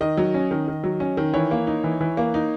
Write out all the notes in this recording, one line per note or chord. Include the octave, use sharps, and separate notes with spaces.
D#3 D#5
F#3
C#4
D#3
D#3
F#3
C#4
D#3
E3 C#5
A#3
D#4
E3
E3
A#3
D#4